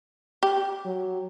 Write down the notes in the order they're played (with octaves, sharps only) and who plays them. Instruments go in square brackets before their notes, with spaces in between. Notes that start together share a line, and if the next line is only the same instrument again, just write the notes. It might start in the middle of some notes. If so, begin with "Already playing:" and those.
[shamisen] G4
[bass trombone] F#3